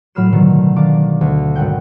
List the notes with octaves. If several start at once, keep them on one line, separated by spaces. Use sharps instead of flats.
A2 F#3 B5 F6 C7 E7
B2 D3 D#3 F#3 A3
D#3 D4 F5 A5 D6 D7
D2
G#1 F#5 G5